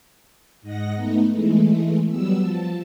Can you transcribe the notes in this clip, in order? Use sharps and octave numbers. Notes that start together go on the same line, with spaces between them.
G#2 D#5 F#5 A#6
A3 B3 D#4
E3 G#3 A3
F#3 G3 B3 E6
F3 A5